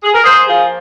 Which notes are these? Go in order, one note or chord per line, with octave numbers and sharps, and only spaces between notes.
G#4
A#4
A#3 G#4 C5
F3 F4 G#4